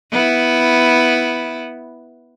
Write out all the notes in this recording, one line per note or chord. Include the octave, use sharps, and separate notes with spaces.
B3 E4